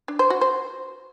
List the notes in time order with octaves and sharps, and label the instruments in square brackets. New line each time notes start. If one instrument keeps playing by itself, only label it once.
[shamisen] D4
C5
F#4
C5